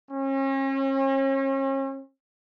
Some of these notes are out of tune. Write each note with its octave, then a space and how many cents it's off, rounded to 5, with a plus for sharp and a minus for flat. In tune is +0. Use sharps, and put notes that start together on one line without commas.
C#4 -40